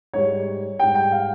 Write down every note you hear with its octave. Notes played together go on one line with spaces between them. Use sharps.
G#2 G3 C#5
G#2 G3 G5
G5
F5